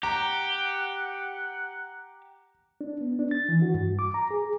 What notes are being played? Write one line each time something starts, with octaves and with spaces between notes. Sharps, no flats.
G4 F#5 A#5
D4
B3
D4
A6
E3
F#4
G2
D6
A#5
G#4